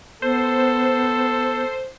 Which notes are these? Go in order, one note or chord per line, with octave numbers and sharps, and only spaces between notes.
B3 A4 C5